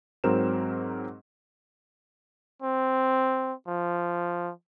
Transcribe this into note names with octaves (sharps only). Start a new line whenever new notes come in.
G#2 F#3 C4 A#4 C5 E7
C4
F3